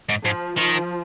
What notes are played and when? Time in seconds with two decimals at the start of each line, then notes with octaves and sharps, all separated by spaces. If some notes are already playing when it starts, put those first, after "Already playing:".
0.09 G#2
0.25 G#2 F3
0.57 D#3 F3